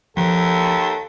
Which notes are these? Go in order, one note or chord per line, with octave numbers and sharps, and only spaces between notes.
D#2 F3 A4